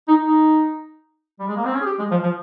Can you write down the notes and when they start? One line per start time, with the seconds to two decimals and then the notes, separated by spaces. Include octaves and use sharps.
0.08 D#4
0.25 D#4
1.40 G3
1.48 G#3
1.57 A#3
1.65 C4
1.74 C#4
1.81 G#4
1.86 G4
1.99 G#3
2.11 F3
2.23 F3